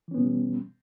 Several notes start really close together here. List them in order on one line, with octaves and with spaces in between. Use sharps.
E3 C#4 B3 B2 G3